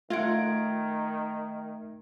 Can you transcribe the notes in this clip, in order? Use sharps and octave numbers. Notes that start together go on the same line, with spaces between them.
D#3 A3 F4 E5 F#5 G#6 D7